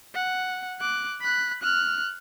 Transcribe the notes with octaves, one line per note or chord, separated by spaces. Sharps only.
F#5
D6 F#6
B5 F#6
F6 F#6